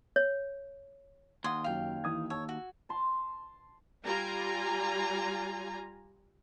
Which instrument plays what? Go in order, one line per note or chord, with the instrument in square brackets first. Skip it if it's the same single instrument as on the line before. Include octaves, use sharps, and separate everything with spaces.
[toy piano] C#5
[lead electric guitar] D#2 [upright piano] F#5 G#6 [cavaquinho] C6 D#6
[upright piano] F#2 F7 [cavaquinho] F5 G5
[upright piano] E3 D#6 G#6
[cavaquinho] C#5 [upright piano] A5 E6
[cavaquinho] F#4
[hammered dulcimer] A5 C6
[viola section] G3 F4 G#5 A#5